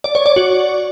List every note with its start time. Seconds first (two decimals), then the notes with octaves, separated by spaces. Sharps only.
0.04 D5
0.15 C#5
0.26 D5
0.36 F#4